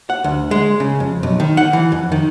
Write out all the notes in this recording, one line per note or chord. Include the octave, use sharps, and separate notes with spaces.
F#5
D2
G#3
C#3
F2
B1
D#3
F#5
E3
F2
D#3